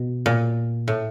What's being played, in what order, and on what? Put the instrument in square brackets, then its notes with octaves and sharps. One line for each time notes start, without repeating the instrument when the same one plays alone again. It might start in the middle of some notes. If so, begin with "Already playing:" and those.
Already playing: [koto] B2
A#2
A2